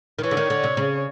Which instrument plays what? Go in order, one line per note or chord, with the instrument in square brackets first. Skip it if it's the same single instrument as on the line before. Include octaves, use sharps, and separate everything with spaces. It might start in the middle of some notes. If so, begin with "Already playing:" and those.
[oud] D#3
[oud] E3 [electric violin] C#5
[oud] D3
D#3
D3
C3
C#3